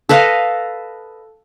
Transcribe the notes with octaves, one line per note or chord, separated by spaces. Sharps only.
A4 B4 D#5 F5